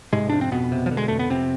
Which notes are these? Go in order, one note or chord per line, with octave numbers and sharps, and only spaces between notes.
G#2 C3 G#3
F2 D4
C4
F2 B2 B3
C3
F3
D3
G#3
F2 A3
B3
F2 C3 C4